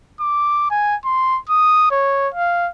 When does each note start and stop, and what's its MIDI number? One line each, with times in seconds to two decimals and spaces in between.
0.20 0.67 86
0.71 0.95 80
1.05 1.39 84
1.49 1.89 87
1.91 2.28 73
2.34 2.70 77